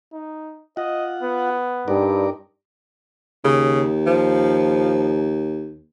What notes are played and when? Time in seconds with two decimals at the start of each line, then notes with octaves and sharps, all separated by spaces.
0.13 D#4
0.77 F4 D#5 F#5
1.22 B3
1.88 G2 D#4 A#4 D5
3.44 D#2 C#3
4.07 F3